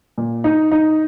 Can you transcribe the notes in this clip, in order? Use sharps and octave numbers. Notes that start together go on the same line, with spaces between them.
A#2
D#4
D#4